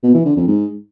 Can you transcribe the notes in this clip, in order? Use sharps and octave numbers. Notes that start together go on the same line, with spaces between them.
B2
E3
D3
F2
G#2